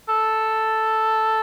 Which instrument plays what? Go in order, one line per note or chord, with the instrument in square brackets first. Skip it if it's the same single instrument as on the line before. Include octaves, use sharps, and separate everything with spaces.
[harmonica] A4